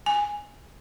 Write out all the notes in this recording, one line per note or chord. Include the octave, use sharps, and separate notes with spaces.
G#5